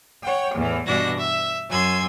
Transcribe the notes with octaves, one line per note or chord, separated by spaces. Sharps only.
C#5 F#5 G5
E2 A2 E3
G2 B2 E3 D4 F#4 A#6
E5
F#2 G#5 C6 E6 G#6